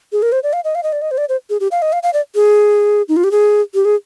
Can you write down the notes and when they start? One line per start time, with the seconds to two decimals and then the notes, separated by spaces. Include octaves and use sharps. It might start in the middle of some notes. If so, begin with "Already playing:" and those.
0.12 G#4
0.22 A#4
0.32 C5
0.43 D5
0.53 F5
0.64 D#5
0.75 F5
0.83 D#5
0.93 D5
1.02 D#5
1.11 C5
1.18 D5
1.29 C5
1.50 G#4
1.60 G4
1.71 F5
1.82 D#5
1.93 F5
2.03 F5
2.13 D5
2.35 G#4
3.09 D#4
3.16 F4
3.24 G4
3.31 G#4
3.74 G4
3.85 G#4